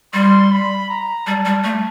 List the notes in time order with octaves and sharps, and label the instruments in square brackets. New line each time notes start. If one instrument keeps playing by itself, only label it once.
[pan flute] G3 [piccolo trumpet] C6
[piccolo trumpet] B5
A#5
[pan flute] G3 [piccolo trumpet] A5
[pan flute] G3
A3